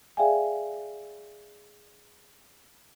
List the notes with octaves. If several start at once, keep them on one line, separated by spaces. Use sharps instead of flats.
G#4 D5 E5 F5 G5 G#5